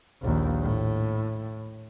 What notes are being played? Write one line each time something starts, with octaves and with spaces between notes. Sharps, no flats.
A#1 D#2
A2